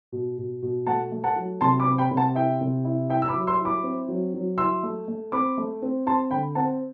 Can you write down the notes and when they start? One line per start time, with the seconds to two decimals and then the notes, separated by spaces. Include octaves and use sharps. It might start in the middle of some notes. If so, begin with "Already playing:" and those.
0.12 B2
0.38 B2
0.62 B2
0.87 A3 F#5 A5
1.12 A3
1.24 F#5 A5
1.36 F#3
1.61 C3 A5 C6
1.80 B5 D6
1.87 C4
1.98 G5 B5
2.11 C3
2.17 F#5 A5
2.35 E4 E5 G5
2.61 C3
2.85 E4
3.10 E4 E5 G5
3.22 E6
3.28 B5 D6
3.34 F#3
3.47 C6 E6
3.60 E4
3.65 B5 D6
3.83 C4
4.08 F#3
4.34 F#3
4.58 E4 C6 E6
4.83 A3
5.08 A3
5.32 C4 B5 D6
5.58 A3
5.82 C4
6.06 C4 A5 C6
6.31 D3 G5 B5
6.55 C4 F#5 A5